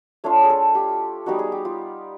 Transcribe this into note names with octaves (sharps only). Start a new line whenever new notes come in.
A3 D4 F4 C#5
G#4
A4
G4
G3 B3 D#4 F#4
G#4
G4
F4